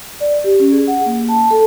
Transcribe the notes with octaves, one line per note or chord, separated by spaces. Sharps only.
D5
G4
C#4
G#4
F#5
A#3
A5
A4